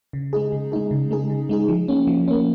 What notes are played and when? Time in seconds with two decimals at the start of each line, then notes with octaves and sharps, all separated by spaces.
0.13 C#3
0.33 G#3 D#4 G#4
0.52 C#3
0.72 G#3 D#4 G#4
0.91 C#3
1.11 G#3 D#4 G#4
1.30 C#3
1.49 G#3 D#4 G#4
1.68 F3
1.88 A#3 C#4
2.07 F3
2.28 A#3 C#4